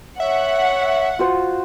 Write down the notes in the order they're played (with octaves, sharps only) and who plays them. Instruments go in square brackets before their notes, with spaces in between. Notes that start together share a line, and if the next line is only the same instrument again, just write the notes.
[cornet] C#5 [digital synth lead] E5 [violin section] F#5
[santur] F4 F#4 C5